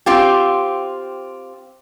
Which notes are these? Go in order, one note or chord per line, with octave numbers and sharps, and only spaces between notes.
C4 F4 G4